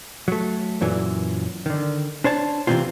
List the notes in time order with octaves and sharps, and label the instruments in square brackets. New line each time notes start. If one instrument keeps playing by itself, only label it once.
[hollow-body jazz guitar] F#3 A3
F#2 A#2 E3 F#3
D3 D#3
D4 C5 C#5 A5
C3 E3 F3 A#3 C4 F4